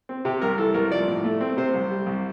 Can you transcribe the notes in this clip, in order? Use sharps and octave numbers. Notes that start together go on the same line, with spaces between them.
C4
C3 G4
C2 A#4
E3 A4
C2 A#4
F3 D5
A2
A3
C4
C3 C5
C2
G3
C2